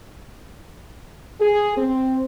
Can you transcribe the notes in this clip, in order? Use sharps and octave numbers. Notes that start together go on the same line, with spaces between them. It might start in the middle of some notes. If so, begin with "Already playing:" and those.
G#4
C4